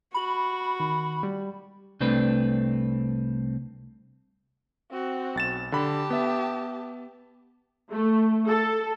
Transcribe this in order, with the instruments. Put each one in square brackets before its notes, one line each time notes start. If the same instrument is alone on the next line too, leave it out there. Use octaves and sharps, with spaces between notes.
[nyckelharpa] F#4 [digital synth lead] B5
[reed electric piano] D#3
G3
[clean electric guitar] C2 A3 C4 D4 B4
[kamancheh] C4 F#4
[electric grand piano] B1 A6 E7
[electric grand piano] D3 B5 [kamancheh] G4 A5
[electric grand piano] B3 E5
[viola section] A3
A4